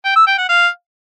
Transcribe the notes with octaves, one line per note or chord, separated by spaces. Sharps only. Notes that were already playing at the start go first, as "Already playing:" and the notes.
G5
E6
G5
F#5
F5